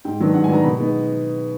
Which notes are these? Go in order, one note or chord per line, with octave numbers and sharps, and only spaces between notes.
G#2 G5
D#3 F#3 B3 D4
G#2 F#5
G#5
D#3 F#3 B3 D4 A#5
B2 B5
G#3 B3 D#4